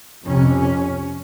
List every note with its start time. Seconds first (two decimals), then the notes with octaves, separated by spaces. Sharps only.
0.25 F2 C3 C#4